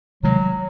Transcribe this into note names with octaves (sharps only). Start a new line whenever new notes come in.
C3 D#3 F#3 G#3